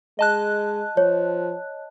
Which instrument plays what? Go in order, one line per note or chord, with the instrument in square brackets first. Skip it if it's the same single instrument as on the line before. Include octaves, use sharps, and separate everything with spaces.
[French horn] G#3 [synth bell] D#5 A5 F#6
[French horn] F3 [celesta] C#5